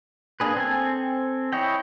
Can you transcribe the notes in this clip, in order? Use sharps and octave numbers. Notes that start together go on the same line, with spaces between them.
A#3 D4 G#4 B4
C4 A4 G#5
E4 C#5 D#5 G5